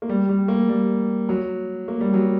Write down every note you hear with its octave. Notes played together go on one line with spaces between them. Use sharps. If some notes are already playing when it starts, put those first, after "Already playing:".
A#3
G3
G3
A#3
G3
F#3
A#3
G3
F#3